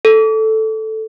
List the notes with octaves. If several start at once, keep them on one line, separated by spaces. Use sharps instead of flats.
A4